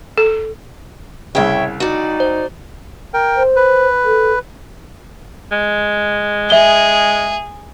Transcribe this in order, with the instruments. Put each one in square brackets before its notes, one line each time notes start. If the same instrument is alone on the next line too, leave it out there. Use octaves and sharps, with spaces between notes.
[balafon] A4
[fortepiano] C2 C#3 [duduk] C#5 [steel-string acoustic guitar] E5 G5
[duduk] D#4 [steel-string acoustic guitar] F#4 D5
[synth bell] C5
[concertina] A#4 G5
[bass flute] C5
[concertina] B4
[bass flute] A4
[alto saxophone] G#3
[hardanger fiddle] G#4 [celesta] E5 G7